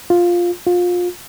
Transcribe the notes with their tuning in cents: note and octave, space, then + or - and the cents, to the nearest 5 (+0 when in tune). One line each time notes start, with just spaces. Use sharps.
F4 +5
F4 +25